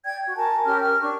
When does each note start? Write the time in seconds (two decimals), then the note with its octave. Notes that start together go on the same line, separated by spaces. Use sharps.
0.05 D5 G5 G#6
0.25 F#4
0.37 A#4 G#5 A5
0.65 C#4 G4 A#4 F6
0.80 F6
1.00 D4 C#6